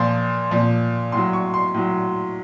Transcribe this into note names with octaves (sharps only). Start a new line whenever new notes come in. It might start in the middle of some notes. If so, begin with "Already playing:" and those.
Already playing: A#2 F3 C6
A#2 F3
A2 F#3 C6
C#6
C6
A2 F#3